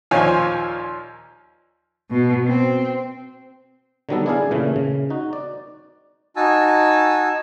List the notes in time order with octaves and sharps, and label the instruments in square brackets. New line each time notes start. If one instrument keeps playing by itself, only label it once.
[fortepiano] D#2 A#2 F3 F4 C#5 G#5
[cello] B2
C4
[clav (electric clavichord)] D3 D#3 F#3 G3 B3 A4
D4 E4 G#4 D5 F5 G#5
A#2 C#3 E3 A3
C#3
D#4 F#4
D5
[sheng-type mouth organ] D#4 F#4 G#5 A5 E6